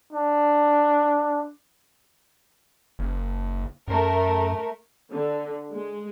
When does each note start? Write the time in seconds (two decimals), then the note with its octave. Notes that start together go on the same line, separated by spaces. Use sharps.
0.13 D4
2.99 F#1
3.88 F#2 A3 A#4
5.13 D3
5.72 G#3